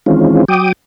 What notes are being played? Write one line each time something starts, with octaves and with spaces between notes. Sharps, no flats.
D#3 E3 G#3 C4 C#4 F4
F#3 G5 D6 D#6